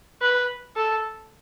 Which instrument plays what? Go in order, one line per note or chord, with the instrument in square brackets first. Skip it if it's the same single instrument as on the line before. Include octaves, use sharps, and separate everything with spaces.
[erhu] B4
A4